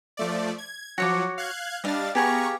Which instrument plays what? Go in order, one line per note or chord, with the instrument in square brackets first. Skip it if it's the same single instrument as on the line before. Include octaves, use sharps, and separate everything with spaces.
[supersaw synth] F3 A3 D5
G#6
[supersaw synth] F3 F#3 [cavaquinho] F#4 C#5 D6
[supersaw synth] F5 F#6 G#6
[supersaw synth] G3 D4 A6 [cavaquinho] D#5 F5
[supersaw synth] B3 A#5 C#6 [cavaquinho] G4 G#4 F5